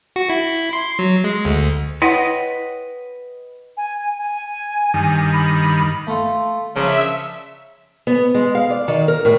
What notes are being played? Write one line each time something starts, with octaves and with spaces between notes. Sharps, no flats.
F#4
E4
C6
F#3
G#3
D2
E4 B4 C#5 D#5 F#5 G5
G#5
G#5
G2 D#3
B5
A3 F4
C#3 F3 D4 A#4 E5
B3
G#3
F5
D5
D#3
A#4
A2